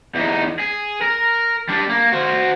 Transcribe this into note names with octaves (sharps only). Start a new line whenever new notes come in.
E2 D#4
G#4
A#4
G3 D4
A#3
F#4 C5